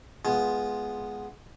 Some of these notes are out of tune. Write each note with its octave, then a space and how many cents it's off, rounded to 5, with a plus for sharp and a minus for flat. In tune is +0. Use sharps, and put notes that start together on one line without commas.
G#3 +10 B3 +0 F4 +0